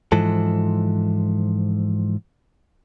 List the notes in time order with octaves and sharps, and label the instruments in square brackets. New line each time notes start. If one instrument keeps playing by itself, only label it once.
[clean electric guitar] G#2 E3 F3 A4